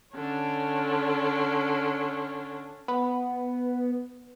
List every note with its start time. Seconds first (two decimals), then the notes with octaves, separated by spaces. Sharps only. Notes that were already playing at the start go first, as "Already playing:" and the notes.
0.15 D3 C#4
2.88 B3